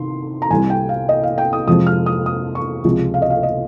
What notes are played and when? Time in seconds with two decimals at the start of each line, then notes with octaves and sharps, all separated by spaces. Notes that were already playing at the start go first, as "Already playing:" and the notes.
Already playing: C3 D#3 C6
0.42 A#5
0.50 C2 C3 G3 G#5
0.70 G5
0.89 F5
1.09 D#5
1.23 F5
1.38 G5
1.53 D#6
1.67 F2 C3 F3 G#3 D#6
1.87 F6
2.06 D#6
2.26 D#6
2.55 C#6
2.84 C#2 C3 F3 G#3
3.14 F5
3.22 D#5
3.30 F5
3.43 D#5